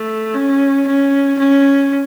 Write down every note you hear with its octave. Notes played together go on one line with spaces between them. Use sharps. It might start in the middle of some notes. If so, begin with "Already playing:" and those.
Already playing: A3
C#4
C#4
C#4